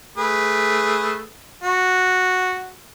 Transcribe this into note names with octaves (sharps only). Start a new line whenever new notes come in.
A3 G#4 B4
F#4